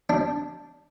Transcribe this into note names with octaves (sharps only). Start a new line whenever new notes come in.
D4